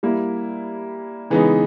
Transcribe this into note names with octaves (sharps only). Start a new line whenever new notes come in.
G3 A#3 E4
C#3 E3 G#3 B3 D#4